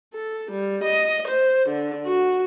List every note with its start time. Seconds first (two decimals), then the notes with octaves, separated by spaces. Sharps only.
0.14 A4
0.51 G3
0.83 D#5
1.27 C5
1.69 D3
2.06 F#4